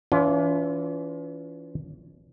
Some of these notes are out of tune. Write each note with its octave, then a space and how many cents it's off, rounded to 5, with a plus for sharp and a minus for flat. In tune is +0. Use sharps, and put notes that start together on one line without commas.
E3 +10 C#4 +40 F4 +0